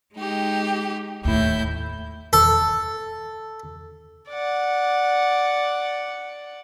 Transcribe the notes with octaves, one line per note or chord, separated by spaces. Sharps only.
G#3 D#4 G4
D#2 A2 E4 G6
A4
D5 F#5